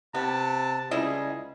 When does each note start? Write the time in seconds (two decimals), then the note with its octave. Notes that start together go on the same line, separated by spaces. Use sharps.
0.14 C3 B3 A5
0.91 C#2 G3 E4 G#4 D#5